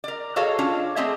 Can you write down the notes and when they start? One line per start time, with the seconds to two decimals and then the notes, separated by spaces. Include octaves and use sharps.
0.04 A#4 D5
0.36 F#4 G#4 A4 C#5 D#5 F5
0.59 C#4 D4 F4
0.96 A3 C4 G4 G#4 D#5 E5